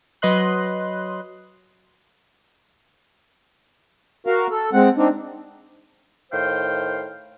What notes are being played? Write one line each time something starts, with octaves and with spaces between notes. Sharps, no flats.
F#3 B4 D#5 C6 F#6
F#4 A#4 F5
A4
G#3 C4 F#5
C4 D4 D#4
A2 D#3 C5 F5 G5